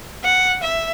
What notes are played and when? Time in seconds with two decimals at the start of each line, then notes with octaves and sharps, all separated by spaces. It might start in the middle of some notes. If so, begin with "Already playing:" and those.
0.24 F#5
0.63 E5